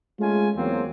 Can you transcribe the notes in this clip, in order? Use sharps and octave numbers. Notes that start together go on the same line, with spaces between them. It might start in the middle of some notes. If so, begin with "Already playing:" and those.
G#3 A3 C#4 F4 G#5
E2 F#3 A#3 C4